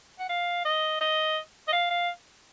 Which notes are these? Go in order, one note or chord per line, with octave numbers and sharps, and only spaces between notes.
F#5
F5
D#5
D#5
D#5
F5
F5